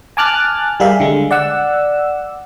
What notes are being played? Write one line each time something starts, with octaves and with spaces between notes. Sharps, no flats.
G#5 A5 D6 F6 F#6 A6
G3 G4 G#4 A#4 E5 F5
D3 G#3
D5 F#5 E6